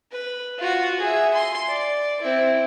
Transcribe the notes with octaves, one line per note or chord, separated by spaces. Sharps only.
B4
F4 F#4
G#4 E5
C6
D5
C4 E4